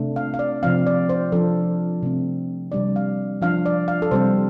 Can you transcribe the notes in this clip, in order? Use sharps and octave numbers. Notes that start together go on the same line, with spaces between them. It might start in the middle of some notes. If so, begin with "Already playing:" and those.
Already playing: C3 A3 D4
F5
F5
D5
C3 F3 C4 F5
D5
C5
F3 D4 A4
C3 A3 C4
C3 G3 D4 D5
F5
F3 D4 F5
D5
F5
A4
C3 G3 C4 C5